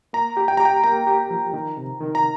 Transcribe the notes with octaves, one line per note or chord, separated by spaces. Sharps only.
A#3 A#5
G4
G5
G4 A#5
G5
A#3 A#5
G4
F3
D#3
C3
D#3
A#5